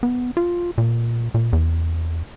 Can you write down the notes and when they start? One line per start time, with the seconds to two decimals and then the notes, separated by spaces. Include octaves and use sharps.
0.03 B3
0.37 F4
0.78 A#2
1.34 A#2
1.53 E2